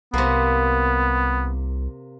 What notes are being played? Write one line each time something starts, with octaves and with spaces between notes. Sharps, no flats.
C2 C3 A#3 B3